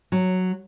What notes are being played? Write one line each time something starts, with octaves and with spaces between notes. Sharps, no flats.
F#3